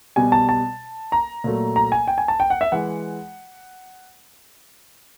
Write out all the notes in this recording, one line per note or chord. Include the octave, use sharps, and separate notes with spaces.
B2 G3 G#5
A5
A5
A#5
A#2 F#3 A3
A#5
G#5
G5
G#5
A5
G5
F#5
E5
E3 G#3 F#5